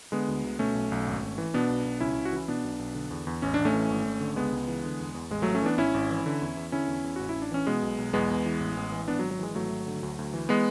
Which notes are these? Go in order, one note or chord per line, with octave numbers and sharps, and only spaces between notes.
D3 G#3 B3
D2
D2
B2 A3 C#4
B1
B1
G#1
G#1
E3
B2 B3 D4
B1
B1
C#2 C#4 E4
C#2
F#4
E3 E4
B2 B3 D4
B1
B1
D3
E2
E2
A1 C#4
A1 D4
A3 C#4
E3
G#1
G#1
D3
C#2 G#3 B3
C#2
E3
D3
E2
E2
A1 G#3
A1 F#3 A3
A3 C#4
E3 B3 D4
G#1 C#4 E4
G#1
E3
D3
E2
E2
D3 C#4 E4
E2
E2
A1 F#4
E4
A1
D4
E3 C#4
B2 G#3 B3
B1
B1
E2 G#3 B3
E2
E3
A1
A1
E3
G#1 B3 D4
F#3
G#1
F#3
E3 G#3
G#1 F#3 A3
G#1
D3
D2
D2
E3
G#3 B3